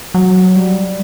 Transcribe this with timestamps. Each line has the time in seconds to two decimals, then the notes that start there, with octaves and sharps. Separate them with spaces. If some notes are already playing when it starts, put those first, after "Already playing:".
0.14 F#3
0.56 G3